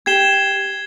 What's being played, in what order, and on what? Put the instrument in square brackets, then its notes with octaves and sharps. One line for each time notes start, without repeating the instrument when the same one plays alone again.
[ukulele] G4 [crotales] G#6 C7 E7 G7